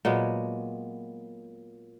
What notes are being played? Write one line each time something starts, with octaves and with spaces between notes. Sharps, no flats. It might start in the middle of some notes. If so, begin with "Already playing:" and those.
A#2 F#3 G#3 B3